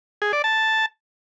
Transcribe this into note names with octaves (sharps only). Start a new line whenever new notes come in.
G#4
D5
A5